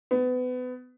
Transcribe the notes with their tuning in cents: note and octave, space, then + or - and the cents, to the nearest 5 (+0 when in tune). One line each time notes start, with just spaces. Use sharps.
B3 +30